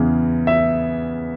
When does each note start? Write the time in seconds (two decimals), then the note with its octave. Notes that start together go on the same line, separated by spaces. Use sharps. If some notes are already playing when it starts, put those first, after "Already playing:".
Already playing: E2 C#3 E3
0.47 E5